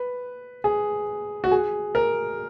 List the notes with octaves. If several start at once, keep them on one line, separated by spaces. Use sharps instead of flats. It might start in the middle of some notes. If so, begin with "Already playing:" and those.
Already playing: B4
G#4
F#4
G#4
A#4